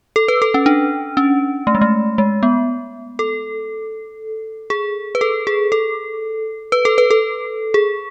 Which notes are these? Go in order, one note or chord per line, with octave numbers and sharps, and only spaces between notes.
A4
B4
A4
C#4
D4
C#4
A3
G#3
A3
G#3
B3
A4
G#4
B4
A4
G#4
A4
B4
A4
B4
A4
G#4